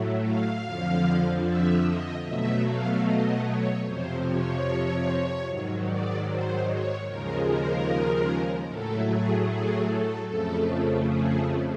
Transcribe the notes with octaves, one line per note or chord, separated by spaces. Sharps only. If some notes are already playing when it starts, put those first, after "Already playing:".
Already playing: A2 F#3 A3
F5
F2 D3 F3
E5
D#5
B2 F#3 A3 E5
F5
D#5
C#5
F2 C3 F3 C5
C#5
G#2 D#3 F#3
D5
C5
C#5
D#2 C#3 F3 G#3 A#4
A#4
A2 F#3 A3 A4
G#4
G#4
A4
F2 C#3 F3 A3 A4
G#4